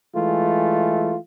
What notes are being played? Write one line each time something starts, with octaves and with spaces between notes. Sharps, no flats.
E3 G#3 A3 F4